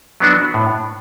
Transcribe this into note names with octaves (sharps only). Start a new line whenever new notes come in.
F#3 B3 D4 F#4
A2